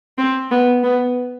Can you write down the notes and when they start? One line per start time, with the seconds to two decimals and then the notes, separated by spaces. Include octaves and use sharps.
0.18 C4
0.51 B3
0.83 B3